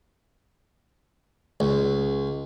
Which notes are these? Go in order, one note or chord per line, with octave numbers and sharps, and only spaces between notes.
C#2